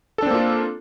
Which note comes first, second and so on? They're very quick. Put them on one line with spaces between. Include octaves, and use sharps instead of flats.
A4 D4 C4 A#3 F4